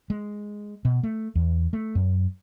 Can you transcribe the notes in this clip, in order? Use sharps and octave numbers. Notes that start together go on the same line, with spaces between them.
G#3
B2
A3
E2
A3
F#2